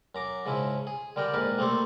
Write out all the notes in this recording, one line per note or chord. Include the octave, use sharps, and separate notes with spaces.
F#2 A#5 D6
G#2 C#3 F3 E4
G#4
D3 G3 A#4 D5 G5
A#1 G#2 A#4 B4 A5
G3 A3 A#3 C4 A4 C5